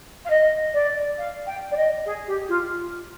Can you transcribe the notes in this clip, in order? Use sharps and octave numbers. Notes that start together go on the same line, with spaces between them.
F5
D#5
D5
F5
G5
D5
D#5
G#4
G4
F4